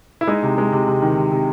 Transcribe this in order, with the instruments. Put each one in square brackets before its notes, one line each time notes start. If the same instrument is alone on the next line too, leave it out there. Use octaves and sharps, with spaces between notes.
[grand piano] E4
G#3 D#4
C3
G#3
C3
C3
D#3
C3
C3